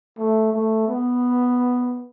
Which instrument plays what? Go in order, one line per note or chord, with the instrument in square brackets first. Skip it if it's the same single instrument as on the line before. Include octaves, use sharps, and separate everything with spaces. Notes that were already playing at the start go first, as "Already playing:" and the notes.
[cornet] A3
A3
B3